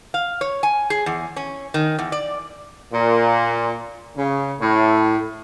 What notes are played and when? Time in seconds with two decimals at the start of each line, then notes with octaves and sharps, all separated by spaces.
0.14 F5
0.41 C#5
0.63 G#5
0.90 G#4
1.06 E2
1.36 C#4
1.74 D#3
1.99 E2
2.12 D5
2.93 A#2
4.17 C#3
4.61 A2